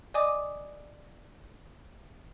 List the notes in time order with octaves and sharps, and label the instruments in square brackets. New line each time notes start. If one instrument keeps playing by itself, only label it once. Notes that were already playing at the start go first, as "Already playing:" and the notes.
[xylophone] D5 D#5 G#5 D6 D#6